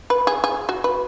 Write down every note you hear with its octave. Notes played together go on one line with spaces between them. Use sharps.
B4
G#4
G#4
F#4
B4